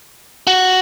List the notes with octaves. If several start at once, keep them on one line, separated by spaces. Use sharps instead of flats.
F#4